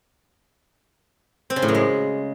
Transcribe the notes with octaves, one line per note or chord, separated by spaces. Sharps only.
C4
C#3
A2
F#2
G#3